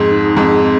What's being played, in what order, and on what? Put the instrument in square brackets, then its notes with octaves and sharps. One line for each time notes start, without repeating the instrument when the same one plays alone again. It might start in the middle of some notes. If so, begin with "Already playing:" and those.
Already playing: [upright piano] F2 G#2 [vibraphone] G#4
[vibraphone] D#4
[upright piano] F2 G#2 [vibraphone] G#4
[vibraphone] C4